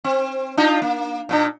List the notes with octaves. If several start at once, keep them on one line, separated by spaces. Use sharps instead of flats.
C4
D4 D#4 F4
A#3
A#2 B3 D4